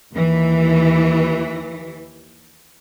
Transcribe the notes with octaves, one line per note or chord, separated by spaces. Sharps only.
D#2 E3